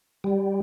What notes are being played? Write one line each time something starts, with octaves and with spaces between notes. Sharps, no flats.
G3